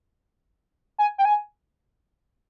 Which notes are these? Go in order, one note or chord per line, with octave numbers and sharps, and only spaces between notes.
G#5
G5
G#5